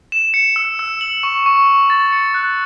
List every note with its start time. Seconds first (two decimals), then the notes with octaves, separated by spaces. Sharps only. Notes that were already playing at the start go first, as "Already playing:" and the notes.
0.12 E7
0.34 C#7
0.56 E6
0.79 E6
1.01 F#7
1.23 C#6
1.46 C#6
1.67 C#6
1.90 A6
2.12 C#7
2.34 F#6